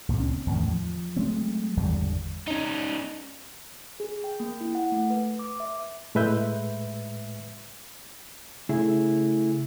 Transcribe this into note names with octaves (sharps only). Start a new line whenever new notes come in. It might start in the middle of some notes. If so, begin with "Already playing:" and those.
C#2 A#2
C4 C#4
E2 A2 D#3
F3
F#3 G#3 A3 C4
G#1 E2 D3 G3
C#4 D#4
G#4
G5
A#3
E4
F#5
A3
B4
D6
E5
A2 G#3 B4 E5 G6
C#3 A3 E4 G#4